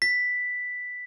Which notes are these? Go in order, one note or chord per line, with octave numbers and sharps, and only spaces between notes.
B6